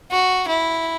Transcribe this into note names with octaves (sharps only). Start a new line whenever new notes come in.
F#4
E4